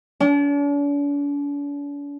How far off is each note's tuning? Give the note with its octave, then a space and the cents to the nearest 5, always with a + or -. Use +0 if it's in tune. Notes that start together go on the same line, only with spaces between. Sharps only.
D4 -45